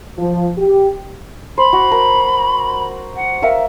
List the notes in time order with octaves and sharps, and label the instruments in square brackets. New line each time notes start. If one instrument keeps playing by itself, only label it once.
[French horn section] F3
G4
[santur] C5 [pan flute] B5
[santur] F#4
A#4 A#5
[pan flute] F#5
[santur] A#4 E5 F5